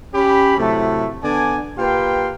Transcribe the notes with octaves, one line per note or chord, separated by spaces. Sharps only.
C#4 G4 B5
A2 C3 F#3 A3
D3 B3 D4 D5 G#5
A#2 G4 B4 F5 G5 C6